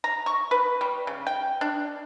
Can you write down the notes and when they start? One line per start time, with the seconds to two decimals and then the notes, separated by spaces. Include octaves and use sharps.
0.04 A#5
0.26 C#6
0.51 B4
0.81 G3
1.07 C#3
1.27 G5
1.61 D4